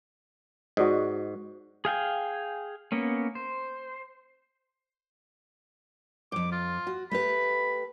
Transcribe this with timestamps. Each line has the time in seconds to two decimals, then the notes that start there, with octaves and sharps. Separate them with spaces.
0.77 G#2 F#4 D5 D#5
1.85 G#4 F5 G5 G#5
2.92 A#3 B3 C#4
3.35 C5
6.32 F2 G#2 D6
6.52 F4
6.87 F#4
7.11 A3 G4 B4 B5